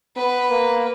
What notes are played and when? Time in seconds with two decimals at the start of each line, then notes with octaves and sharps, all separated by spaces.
0.16 B3 B4
0.50 A#3